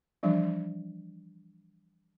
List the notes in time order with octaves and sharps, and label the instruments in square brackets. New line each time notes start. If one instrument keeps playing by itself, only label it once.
[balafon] E3 F3 G3 D4